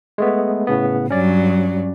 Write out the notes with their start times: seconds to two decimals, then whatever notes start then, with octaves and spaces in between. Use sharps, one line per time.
0.18 G#3 A3 B3
0.67 A2 C#3 B3
1.10 G2 F#3 C#4 D5